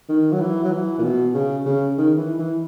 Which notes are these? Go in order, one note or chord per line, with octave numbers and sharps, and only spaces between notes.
D#3
F#3
E3
F#3
E3
A#2
B2
C#3
C#3
D#3
E3
E3